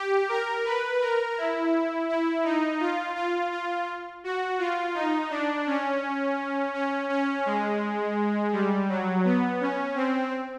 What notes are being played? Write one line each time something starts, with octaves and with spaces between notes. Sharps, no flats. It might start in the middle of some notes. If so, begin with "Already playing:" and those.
Already playing: G4
A#4
B4
A#4
E4
E4
D#4
F4
F4
F4
F#4
F4
D#4
D4
C#4
C#4
C#4
G#3
G3
F#3
B3
C#4
C4